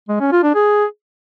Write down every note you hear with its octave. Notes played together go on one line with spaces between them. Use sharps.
G#3
C#4
F4
D4
G#4